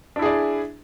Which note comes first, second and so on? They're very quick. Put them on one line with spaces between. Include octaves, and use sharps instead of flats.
D4 E4 G#4 D5